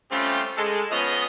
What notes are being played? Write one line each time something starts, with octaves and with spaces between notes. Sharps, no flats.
G3 A3 C4 C#4 F4 G4
G#3 A4
F3 B3 C#4 D#5